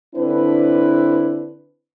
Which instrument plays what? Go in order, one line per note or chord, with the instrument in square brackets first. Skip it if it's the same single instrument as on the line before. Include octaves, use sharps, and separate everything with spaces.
[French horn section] D3 C4 D4 E4 B4